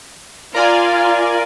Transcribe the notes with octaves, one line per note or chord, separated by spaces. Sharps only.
F4 A#4 D5 G#5